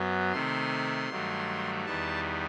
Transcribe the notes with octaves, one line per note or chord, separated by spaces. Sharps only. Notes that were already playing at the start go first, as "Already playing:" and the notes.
Already playing: F#2 F#3 B3
C3 D#3 A3 C6
G2 D#3 F#3 A3
E2 D#3 G3 B3 A5